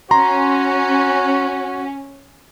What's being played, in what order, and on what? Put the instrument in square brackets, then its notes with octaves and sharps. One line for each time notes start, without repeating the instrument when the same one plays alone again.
[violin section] C#4 [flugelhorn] F#4 [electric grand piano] A#5 C6